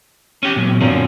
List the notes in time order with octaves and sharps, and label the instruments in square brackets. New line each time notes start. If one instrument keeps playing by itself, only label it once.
[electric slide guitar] C#4 G4
A#2 F#3
[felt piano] F#2 A#2 D3 [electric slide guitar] C4 C#4